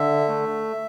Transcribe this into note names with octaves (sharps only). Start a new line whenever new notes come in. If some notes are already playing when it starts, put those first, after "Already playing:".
Already playing: D3 E5
A3